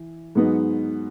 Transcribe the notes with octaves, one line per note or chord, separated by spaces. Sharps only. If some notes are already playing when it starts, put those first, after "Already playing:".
Already playing: E3
G#2 F#3 B3 D#4